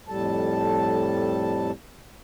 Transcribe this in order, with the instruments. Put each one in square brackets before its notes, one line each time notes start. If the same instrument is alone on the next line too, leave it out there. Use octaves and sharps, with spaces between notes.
[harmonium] F2 A2 G3 A4 A5